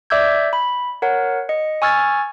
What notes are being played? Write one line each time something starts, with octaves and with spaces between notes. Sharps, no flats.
D5 E5 D6 E6 G6 G#6
B5
A#4 C#5 F#5
D#5 C#7
G#5 C#6 E6 F6 G#6 A6